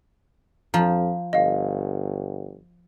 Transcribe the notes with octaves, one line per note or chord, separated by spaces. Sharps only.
F2 F3 A#5
G1 D#5 F5